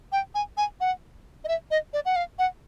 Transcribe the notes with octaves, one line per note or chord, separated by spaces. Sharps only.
G5
G#5
G#5
F#5
D#5
E5
D#5
D5
F#5
F5
F#5